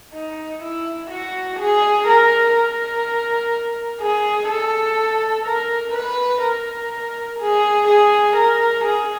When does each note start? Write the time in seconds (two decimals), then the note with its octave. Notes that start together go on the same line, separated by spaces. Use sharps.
0.14 D#4
0.62 E4
1.10 F#4
1.59 G#4
2.07 A#4
2.56 A#4
4.01 G#4
4.49 A4
5.45 A#4
5.94 B4
6.42 A#4
7.39 G#4
7.87 G#4
8.36 A#4
8.84 G#4